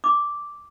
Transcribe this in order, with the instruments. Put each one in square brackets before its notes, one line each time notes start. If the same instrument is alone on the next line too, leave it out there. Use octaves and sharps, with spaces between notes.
[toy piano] D6